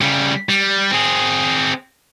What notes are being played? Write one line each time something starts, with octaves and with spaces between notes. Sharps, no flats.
C#3 G3
G3
C4 G#4